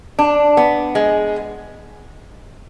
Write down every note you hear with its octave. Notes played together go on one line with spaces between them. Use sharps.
D4
B3
G#3